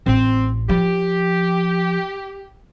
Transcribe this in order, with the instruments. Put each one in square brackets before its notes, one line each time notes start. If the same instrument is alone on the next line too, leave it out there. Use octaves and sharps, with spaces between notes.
[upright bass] A1 [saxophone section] C4
[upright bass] F3 [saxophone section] G4